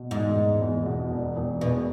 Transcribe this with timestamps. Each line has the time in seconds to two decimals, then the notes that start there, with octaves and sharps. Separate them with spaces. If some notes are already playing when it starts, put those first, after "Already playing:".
Already playing: B2
0.11 E1 G#2
0.36 E1
0.61 E2
0.86 B2
1.11 E1
1.36 E1
1.61 E2 B2